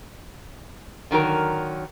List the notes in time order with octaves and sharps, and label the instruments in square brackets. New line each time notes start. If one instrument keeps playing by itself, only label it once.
[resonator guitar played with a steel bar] D3 D#3 F#3 A#4